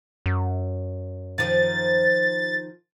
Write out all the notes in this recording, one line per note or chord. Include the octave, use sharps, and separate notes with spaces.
F#2
D#3 F3 A6